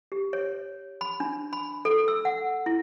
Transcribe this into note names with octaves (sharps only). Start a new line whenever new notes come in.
G4
C#5
B5
D4
B5
A4
E6
F#5
E4